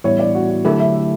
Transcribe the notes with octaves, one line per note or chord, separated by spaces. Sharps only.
A2 E3 G3 B3 E4 C#5
D5
F#4
F#4
D3 F#3 A3 E4 G4 A4
E5